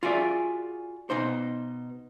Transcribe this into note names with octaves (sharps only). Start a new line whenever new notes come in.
F4 F#4 G#4 D5 E5
B2 D#4 C5